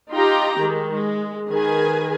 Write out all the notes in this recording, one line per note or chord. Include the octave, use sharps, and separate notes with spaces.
D#4 F4 G4 G5 A#5
D#3 G#3
G#3
D#3 G#4 B4 G#5